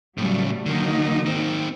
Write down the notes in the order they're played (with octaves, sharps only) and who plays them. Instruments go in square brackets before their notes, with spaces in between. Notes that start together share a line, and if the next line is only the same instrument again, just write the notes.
[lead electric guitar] A2 C#3 [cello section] F#3 G3 A3
[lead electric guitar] D3 D#3 [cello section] F#3 A#3 D#4
[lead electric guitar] D#3 C4